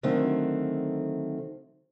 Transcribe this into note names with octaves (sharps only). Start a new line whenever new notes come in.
D3 D#3 F#3 A3 C4